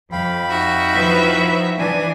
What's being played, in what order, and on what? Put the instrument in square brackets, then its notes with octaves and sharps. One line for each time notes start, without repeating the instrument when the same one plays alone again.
[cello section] F2 [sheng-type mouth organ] F5 G5 B5
[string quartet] D#4 F#4 E5
[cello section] F3 E4 B4
[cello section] E3 D4 [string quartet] G#5